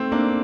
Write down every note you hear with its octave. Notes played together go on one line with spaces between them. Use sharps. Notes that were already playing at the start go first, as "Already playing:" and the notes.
Already playing: A3 C4
A#3 D4